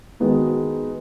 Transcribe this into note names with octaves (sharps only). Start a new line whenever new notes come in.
D#3 G#3 B3 D#4 F#4